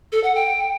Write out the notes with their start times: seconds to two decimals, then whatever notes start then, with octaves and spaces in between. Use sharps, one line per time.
0.12 A4
0.24 F#5
0.35 G5